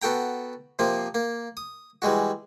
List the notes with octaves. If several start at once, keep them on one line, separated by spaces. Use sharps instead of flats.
B3 F#4 A4 G5 A#5
C3 F3 A#3
A#3
D#6
E3 G3 G#3 F#4